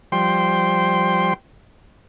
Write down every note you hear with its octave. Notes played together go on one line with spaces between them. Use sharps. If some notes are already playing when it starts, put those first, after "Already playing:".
F3 G3 C5 G5 C6